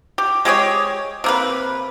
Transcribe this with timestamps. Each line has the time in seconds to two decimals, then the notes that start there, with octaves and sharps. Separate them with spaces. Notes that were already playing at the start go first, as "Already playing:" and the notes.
0.18 G4
0.45 G#3 G4 G#4 C#5
1.24 C3 A#3 B4